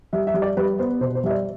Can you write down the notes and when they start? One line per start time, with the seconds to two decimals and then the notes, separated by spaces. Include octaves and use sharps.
0.13 G3 E5
0.27 E5
0.34 G3
0.42 D5
0.57 G3 B4
0.79 B3 C5
1.01 B2 C5
1.15 C5
1.23 G3 E5
1.30 D5